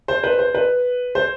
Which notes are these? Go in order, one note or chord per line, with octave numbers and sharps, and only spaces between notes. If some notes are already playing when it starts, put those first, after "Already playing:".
C5
B4
C5
B4
C5